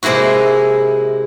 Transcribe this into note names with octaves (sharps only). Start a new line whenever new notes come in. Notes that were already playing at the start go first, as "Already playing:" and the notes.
C3 G#3 A#3 E4 F#4